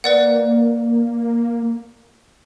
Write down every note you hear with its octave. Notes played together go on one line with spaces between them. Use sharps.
A#3 B4 D5 F#5